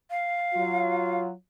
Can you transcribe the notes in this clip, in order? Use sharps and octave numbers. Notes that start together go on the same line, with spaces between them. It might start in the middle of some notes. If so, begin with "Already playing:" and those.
F5
F#3 F4